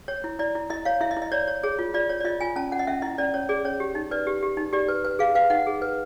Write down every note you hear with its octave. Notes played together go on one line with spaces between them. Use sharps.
C#5
E4
E4 D5
E4
E4 D#5
C#5 F5
E4 E5
D#5
E4
D#5
C#5 D5
C#5
G#4 C#5
F4
F4 D5
C#5
D5
F4 D#5
F4 G#5
C#4 A5
C#4 F#5
D#5
C#4 E5
E4 D#5
C#4 D5
C#4 C#5
G#4 D5
C#4 C#5
G4
D#4
B4 D5
G4
G4
D#4
G4 D5
B4
B4
G#4 F5
B4 F5
D#4 F#5
G#4
B4